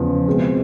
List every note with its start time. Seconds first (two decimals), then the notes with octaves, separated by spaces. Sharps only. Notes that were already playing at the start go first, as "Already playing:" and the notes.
Already playing: E2 C#3 F3
0.26 B2 G#3 C4